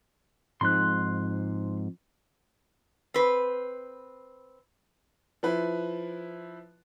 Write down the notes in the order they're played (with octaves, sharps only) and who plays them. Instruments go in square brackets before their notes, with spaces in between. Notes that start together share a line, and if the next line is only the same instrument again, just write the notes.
[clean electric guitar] F2 [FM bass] G#2 [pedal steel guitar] C6 F#6
[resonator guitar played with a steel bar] C4 B4
[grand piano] F3 E4 B4